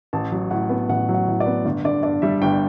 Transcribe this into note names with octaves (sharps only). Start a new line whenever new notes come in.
A1 A5
F#3
A2 F#5
B3
A1 F#5
F#3
F#5
A2
D5
B3
G1
D3 D5
G2 D5
G3 E5
G1 G5